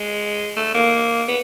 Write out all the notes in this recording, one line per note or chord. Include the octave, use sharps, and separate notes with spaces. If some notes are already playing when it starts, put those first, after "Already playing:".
Already playing: G#3
A3
A#3
B3